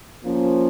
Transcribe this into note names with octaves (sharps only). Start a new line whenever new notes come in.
F3 A#3 C#4